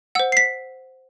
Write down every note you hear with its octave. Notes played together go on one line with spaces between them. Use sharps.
C5 F#5 E6
C7
B6